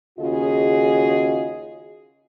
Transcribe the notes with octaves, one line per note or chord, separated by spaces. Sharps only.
D#2 C#3 F4 F#4 G#4 D#5